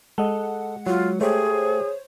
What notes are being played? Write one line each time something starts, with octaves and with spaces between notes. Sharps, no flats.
G#3 A4 D#5 F#5
F#3 F4
A3 G4 G#4 C5 C#5